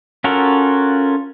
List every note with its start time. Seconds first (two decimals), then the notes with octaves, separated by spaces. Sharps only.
0.24 C#4 F4 F#4 A4 A#4